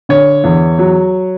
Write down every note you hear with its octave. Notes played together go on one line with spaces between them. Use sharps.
D3 C#5
E2
F#3